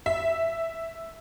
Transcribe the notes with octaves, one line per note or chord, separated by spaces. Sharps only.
E5